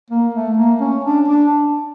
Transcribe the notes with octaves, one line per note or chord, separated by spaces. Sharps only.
A#3
A3
A#3
C#4
D4
D4